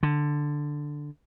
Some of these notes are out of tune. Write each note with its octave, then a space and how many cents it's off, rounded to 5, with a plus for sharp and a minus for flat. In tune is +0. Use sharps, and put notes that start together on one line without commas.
D3 +5